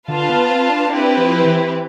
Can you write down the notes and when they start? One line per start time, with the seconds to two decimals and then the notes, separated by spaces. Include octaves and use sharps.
0.08 D3 F4 B4 F5 A5
0.29 B3
0.49 C4
0.70 D4
0.90 C4 D4 E4 G4 B4
1.17 F3
1.45 E3